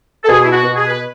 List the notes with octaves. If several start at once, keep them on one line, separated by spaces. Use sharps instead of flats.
A4
B2 G#4
E4
F#4
B2
G#4
B4